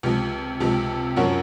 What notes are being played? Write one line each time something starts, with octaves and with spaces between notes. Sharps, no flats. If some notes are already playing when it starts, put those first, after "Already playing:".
C#2 C3 F3
C#2 C3 F3
F#2 F3 A#3 C#4 F#4